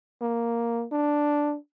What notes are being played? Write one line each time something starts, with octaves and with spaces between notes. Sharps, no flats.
A#3
D4